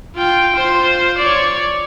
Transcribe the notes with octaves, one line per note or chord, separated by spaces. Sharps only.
F4 G5
F4 C5
C#5 D5